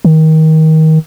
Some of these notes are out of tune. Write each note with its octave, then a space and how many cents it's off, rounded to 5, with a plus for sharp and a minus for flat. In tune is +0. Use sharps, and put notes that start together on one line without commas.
D#3 +25